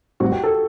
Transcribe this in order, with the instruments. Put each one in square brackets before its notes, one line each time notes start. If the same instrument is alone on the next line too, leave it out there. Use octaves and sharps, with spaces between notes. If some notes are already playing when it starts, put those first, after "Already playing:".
[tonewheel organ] A2 G3 C4 [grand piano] F#4
[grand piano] G4
A4